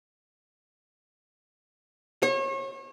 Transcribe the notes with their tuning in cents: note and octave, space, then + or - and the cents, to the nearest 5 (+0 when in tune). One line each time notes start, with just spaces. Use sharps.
C#5 -35